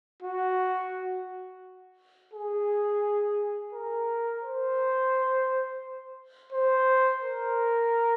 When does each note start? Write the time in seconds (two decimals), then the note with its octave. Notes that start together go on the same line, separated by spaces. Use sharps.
0.22 F#4
2.33 G#4
3.73 A#4
4.43 C5
6.53 C5
7.23 A#4